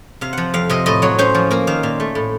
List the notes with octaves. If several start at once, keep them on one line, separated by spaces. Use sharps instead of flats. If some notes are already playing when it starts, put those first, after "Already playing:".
C3 F5
F3 F#5
F2 F5
C3 D#5
A2 D#5
F#3 C#5
C#4 C5
F3
A#3 A#4
D#3 F5
A#2 F5
A3
A2